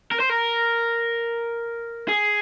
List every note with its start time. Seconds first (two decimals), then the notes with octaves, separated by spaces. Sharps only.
0.12 A#4
0.20 C5
0.30 A#4
2.09 G#4